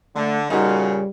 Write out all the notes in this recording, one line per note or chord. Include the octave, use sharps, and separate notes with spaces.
D3 A3
A#2 C#3 G3 D#4 F#4